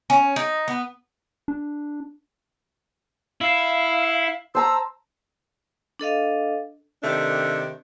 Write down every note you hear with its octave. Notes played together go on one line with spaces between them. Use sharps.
C#4
D#4
B3
D4
E4 F5
C5 A5 A#5 E6
D4 A4 D#5 F5
C3 D#3 A3 D4